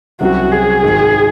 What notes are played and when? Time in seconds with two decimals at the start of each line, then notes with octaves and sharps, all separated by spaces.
0.21 C2 C3 F#3 C#4 F#4
0.52 G#4
0.83 G#1 G#2 D#3